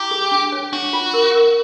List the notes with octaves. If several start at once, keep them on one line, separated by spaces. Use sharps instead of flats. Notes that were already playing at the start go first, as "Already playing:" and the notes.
Already playing: E4 G4
G#4
D4
C#5
D4 F#4
F4
A#4
A#4